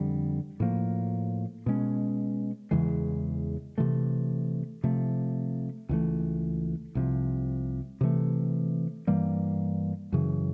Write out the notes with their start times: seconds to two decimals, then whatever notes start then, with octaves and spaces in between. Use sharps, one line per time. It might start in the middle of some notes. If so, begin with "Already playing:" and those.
Already playing: F2 D3 G3
0.60 A2 F3 A#3
1.66 B2 G#3 C#4
2.71 E2 C#3 E3 G#3
3.78 C3 E3 A3
4.84 C3 F3 A3
5.89 C#2 C#3 E3 A3
6.95 C2 C3 F3
8.01 C3 E3 A3
9.07 G2 E3 G3 A#3
10.12 F#2 C#3 E3